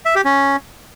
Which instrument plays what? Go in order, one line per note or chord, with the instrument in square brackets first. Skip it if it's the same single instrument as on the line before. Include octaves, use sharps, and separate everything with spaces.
[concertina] E5
G4
C#4